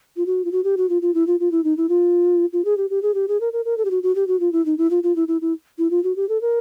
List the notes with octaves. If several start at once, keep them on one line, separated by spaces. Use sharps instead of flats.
F4
F#4
F4
F#4
G4
F#4
F4
F4
E4
F4
F4
E4
D#4
E4
F4
F4
G#4
G4
G4
G#4
G4
G#4
A#4
A#4
A#4
A4
G4
F#4
F#4
G4
F#4
F4
E4
D#4
E4
F4
F4
E4
E4
E4
E4
F4
F#4
G4
A4
A#4